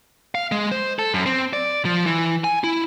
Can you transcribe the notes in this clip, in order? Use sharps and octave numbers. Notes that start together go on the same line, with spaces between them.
F5
G#3
C5
A4
F#2
C4
D5
F3
E3
G#5
E4